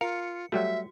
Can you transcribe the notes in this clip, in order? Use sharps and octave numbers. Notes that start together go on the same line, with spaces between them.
F4 A#4 F5 C#7
F#3 G3 A3 F#4 E5